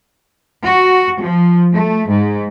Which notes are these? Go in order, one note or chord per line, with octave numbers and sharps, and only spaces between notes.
F#4
F3
A3
G#2